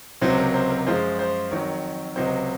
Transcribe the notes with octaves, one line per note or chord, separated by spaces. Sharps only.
C#2 C3 F#3 C5
A#4
C5
A#4
F#2 F3 G#3 C5
C5
F2 D#3 F#3 A#4 C#5
C#2 C3 F#3 C5 D#5